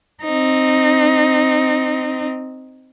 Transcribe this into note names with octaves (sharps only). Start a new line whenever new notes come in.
C4 D#4